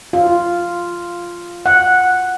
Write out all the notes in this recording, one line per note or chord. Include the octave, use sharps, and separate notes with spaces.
F4
F#5